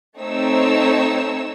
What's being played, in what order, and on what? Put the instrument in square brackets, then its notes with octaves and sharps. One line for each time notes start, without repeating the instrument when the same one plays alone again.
[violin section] A3 C4 D#4 C#5 E6